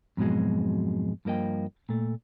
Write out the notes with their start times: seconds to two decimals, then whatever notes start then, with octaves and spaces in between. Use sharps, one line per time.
0.17 F2 G#2 B2 F#3 G#3
1.25 G2 F3 A#3 D#5 G5
1.89 A#2 A3